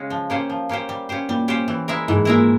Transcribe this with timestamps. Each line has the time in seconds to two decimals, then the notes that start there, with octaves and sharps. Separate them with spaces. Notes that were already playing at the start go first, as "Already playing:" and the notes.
Already playing: C#3 G#3 C#4
0.10 F3
0.30 A#3 C#4 G4 C5
0.50 F3
0.69 A#3 C#4 G4 C5
0.89 G3
1.09 C#4 G4 C5
1.29 A#2 G3
1.48 C#4 G4 C5
1.68 E3
1.88 G#3 E4 A#4 E5
2.08 G#2 E3
2.25 A#2 G#3 E4 A#4 E5